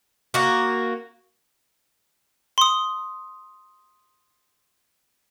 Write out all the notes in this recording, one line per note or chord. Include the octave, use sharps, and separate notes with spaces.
A#3 F#4
C6 D#6